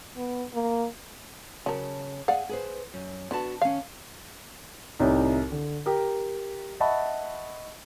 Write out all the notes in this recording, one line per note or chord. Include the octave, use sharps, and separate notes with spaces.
B3
A#3
C#3 F#3 A#4 A5
G#4 D5 F5 F#5 G#5
G#4 B4 C5
F#2
D3 B3 F#4 A5
D#3 C#4 F5
C2 A2 D#4 E4 G4 C#5
D3
G4 A#4
D#5 E5 F#5 A5 B5 C#6